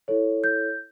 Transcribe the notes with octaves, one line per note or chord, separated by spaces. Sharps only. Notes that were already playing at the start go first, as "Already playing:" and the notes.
E4 A4 C#5
G6